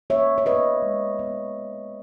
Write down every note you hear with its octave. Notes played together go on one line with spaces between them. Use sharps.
A#3 C#5 E5
C#5
B3 B4 D#5
G#3
B3